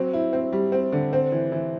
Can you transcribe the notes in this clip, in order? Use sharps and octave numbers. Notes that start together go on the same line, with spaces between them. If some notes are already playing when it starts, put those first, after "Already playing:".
Already playing: F#3 C4
E4
C4
G3
C4
D3
C4
E3
E3